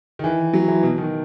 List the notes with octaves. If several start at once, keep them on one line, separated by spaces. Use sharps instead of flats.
D#3
E3
F#3
E3
B2
D#3